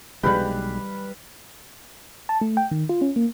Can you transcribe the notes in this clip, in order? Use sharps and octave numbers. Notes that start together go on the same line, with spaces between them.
B1 G3 G#3 G4 B4 F5
A5
A3
G5
D#3
F4
C#4
A#3